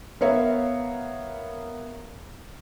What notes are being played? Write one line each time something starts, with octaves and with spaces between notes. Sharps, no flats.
B3 A#4 C#5 E5 F5